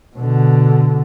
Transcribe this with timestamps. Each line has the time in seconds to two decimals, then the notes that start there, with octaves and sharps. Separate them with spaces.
0.16 B2 D3